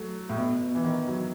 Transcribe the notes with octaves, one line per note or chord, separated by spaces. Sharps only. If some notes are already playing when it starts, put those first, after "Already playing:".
Already playing: F#3 A3
A2
B2
B2
E3
D#3
F#3